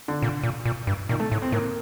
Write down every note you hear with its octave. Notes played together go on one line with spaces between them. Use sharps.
D3
A#2
A#2
A#2
G2
A#2 D#3
A3
A2
C4
A2 A#3